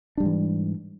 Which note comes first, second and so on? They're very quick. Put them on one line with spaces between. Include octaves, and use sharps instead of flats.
D4 G3 G#2 E3